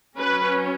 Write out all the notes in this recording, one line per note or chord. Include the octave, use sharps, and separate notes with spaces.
F#3 C#4 B4